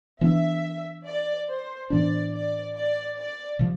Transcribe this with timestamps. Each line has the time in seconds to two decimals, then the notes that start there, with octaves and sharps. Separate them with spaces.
0.21 E3 B3 D4 E5
1.06 D5
1.48 C5
1.90 A2 E3 B3 D4 D5
2.33 D5
2.75 D5
3.17 D5
3.59 C3 F3